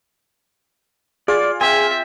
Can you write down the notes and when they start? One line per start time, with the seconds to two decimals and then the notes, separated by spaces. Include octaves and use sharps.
1.28 F4 G#4 D5
1.61 C4 E5 G#5